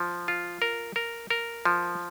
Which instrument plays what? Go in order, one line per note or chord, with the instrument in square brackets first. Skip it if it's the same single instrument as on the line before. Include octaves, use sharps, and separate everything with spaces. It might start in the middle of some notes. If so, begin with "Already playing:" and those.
Already playing: [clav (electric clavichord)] F3
F4
A#4
A#4
A#4
F3